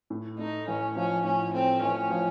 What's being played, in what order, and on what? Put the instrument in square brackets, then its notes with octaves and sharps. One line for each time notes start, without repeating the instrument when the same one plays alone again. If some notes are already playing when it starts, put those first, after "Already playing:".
[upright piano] A2
[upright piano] A3 [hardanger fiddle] D#4
[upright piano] A1 [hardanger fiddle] C#4
[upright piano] F3 [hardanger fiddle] C#4
[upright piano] A2 [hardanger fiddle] C#4
[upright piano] A3 [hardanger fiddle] C4
[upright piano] A1 [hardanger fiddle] C#4
[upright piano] F3